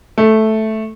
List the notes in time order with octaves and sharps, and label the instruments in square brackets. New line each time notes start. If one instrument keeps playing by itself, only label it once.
[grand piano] A3